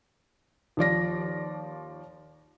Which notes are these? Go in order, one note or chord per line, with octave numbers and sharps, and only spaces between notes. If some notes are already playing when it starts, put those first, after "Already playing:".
D#2 F3 D5 A#6